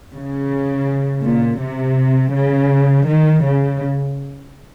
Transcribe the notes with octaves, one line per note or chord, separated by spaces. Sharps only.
C#3
A#2
C3
C#3
D#3
C#3